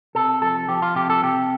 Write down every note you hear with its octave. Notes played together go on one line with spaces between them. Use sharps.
C3 A4
F3 A4
F3 G4
F4
C3 G4
A4
C3 G4